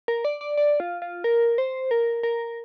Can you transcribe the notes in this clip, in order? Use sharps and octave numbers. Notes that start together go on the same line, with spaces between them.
A#4
D5
D5
D5
F4
F4
A#4
C5
A#4
A#4